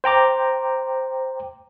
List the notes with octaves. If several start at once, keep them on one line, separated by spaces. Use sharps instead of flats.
C5 G5 A#5 D6